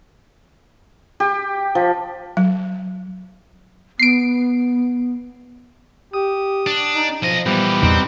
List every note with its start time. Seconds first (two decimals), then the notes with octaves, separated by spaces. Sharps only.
1.20 G4
1.75 F3
2.37 F#3
4.00 B3 C7 D7
6.14 G4 D#6
6.67 D4
6.95 D#4
7.22 B1 F3 D#5
7.46 A#2 E3 G3 B3
7.83 E2 A#2 C4 D#4